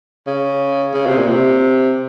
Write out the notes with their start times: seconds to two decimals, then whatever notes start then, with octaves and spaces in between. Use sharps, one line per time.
0.27 C#3
0.94 C#3
1.06 C3
1.18 A#2
1.28 C3